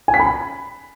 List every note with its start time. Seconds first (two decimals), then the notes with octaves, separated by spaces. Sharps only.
0.08 G#5
0.14 B6
0.20 B5